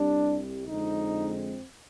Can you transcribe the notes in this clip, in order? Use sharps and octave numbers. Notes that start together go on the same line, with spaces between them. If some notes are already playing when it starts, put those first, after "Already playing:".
Already playing: C2 C3 G3 D4
F2 D3 G#3 C4 D#4